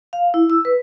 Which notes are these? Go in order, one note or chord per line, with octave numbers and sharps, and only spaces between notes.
F5
E4
E6
B4